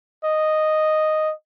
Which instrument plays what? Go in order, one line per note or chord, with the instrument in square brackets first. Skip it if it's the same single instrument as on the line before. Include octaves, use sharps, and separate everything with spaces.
[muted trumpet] D#5